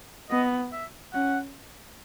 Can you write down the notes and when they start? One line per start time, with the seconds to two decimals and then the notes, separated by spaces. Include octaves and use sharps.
0.30 B3 D#5
0.72 E5
1.14 C#4 F#5